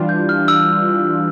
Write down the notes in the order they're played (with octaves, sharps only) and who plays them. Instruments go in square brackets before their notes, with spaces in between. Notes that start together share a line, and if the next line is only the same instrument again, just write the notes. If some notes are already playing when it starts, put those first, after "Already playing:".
Already playing: [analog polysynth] E3 G3 D4 F4
[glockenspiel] G6
F6
E6